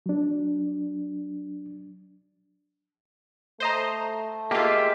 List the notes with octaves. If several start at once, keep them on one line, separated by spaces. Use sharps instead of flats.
F#3 D4
A3 C5 D#5 A#5
G#3 A#3 F4 G4 E5